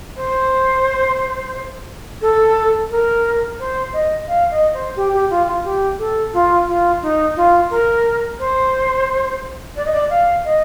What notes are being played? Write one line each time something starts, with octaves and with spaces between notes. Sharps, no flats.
C5
A4
A#4
C5
D#5
F5
D#5
C5
G4
G4
F4
F4
G4
A4
F4
F4
D#4
F4
A#4
C5
D5
D#5
D5
F5
D#5